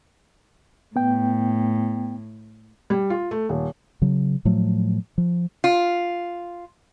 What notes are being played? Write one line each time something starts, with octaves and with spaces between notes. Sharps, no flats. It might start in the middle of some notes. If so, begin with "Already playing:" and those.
A2 B3 G5
G3
F4
A3
D#1
C#3 F#3
A2 F3 F#3 A3
F3
F4